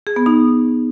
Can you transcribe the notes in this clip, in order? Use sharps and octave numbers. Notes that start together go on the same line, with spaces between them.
G#4
B3
D#4